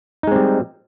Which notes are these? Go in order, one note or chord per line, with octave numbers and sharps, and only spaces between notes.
G3 G#3 C4 D#4